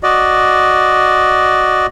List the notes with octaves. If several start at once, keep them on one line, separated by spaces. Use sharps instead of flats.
F#4 D5 D#5